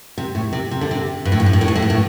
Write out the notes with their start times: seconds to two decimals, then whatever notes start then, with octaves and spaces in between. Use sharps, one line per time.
0.18 C3
0.35 A2
0.53 C3
0.71 C3
0.81 D3
0.91 C3
1.25 G2
1.32 A2
1.40 G2
1.46 A2
1.53 G2
1.61 A2
1.68 G2
1.76 A2
1.82 G2
1.90 A2